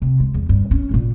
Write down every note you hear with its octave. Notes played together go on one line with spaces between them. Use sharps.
C3
G#3
E2
G2
C#4
A1 A#2